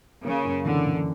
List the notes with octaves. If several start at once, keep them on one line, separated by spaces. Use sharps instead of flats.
C#3 A#3
F#2
D3 E3
E3